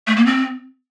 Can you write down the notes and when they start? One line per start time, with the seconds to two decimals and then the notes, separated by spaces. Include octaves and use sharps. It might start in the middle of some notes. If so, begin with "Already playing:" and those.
0.07 A3
0.16 A#3
0.26 C4